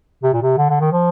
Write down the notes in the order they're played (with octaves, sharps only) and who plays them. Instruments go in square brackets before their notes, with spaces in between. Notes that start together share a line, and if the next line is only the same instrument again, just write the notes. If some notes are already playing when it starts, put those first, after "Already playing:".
[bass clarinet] C3
A#2
C3
D3
D3
D#3
F3